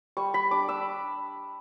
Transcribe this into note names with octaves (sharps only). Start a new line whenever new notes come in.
G3 C#6
G3 B5
D4 D6
D4 E6